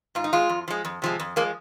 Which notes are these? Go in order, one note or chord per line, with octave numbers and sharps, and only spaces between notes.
G#2 F4
D#4
G#3 F4
F2
F3 G#3
F2
C3 F3 G#3
F2
F3 G#3 A#3